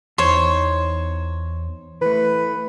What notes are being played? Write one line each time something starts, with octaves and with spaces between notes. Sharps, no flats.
E2 D#4 C5 C#5
E3 A3 B4